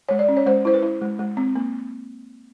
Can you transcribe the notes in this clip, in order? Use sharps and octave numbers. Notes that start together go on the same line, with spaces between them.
G#3 C#5
D5
C#4
C#5
G#3 C5
E4 C5
B4
E4
G#3
G#3
C4
A#3